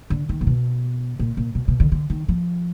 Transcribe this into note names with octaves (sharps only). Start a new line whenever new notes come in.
D3
D#3
A#2
B2
A#2
A#2
B2
B2
D3
D3
D#3
F3